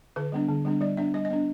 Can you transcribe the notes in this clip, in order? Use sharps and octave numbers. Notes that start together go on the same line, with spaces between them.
D3 B4
G3 B3 D4
D3
G3 B3 D4
G3 D5
B3 D4 E5
G3 D#5
D#5
B3 D4